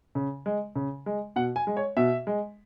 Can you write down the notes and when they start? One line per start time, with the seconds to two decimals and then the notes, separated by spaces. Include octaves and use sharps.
0.15 C#3
0.46 G#3
0.76 C#3
1.06 G#3
1.36 B2 F#5
1.56 G#5
1.67 G#3
1.77 C#5
1.97 B2 E5
2.27 G#3